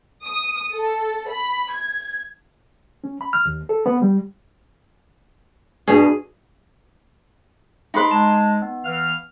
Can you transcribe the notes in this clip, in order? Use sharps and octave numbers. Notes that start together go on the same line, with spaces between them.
D#6
A4
B5
G#6
C#4
B5
F6
D#2
A4
B3
G3
G2 B2 D4 G#4
D#4 B4 A#5 C6 D6
G#3 A5
B3
E3 F5 F6